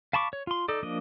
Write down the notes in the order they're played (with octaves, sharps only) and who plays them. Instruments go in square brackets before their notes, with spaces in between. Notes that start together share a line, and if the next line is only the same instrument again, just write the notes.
[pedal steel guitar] F5 A5 B5 C#6 D6
C#5
F4 C6
D#4 A4 D5
F3 A#3 D4 D#5